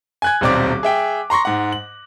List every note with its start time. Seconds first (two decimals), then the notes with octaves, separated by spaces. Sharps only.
0.22 G#5 F#6 G#6
0.41 D#1 B1 C4 D5 D6
0.83 G#4 E5 G5
1.30 A#5 C6 C#6 A#6
1.45 G#2 F#5
1.72 F#7